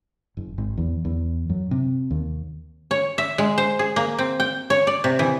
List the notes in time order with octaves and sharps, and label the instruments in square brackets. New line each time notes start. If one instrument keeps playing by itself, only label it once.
[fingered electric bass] F#1
G#1
E2
E2
F#2
C3
D#2
[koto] C#5
E5
G#3
C5
G#4
A#3
C4
G5
C#5
D5
C3
E3